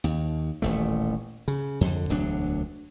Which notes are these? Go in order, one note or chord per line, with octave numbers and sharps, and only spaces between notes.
D#2
D#1 A1 A3
C#3
F2 D3
E1 D2 F#3 D4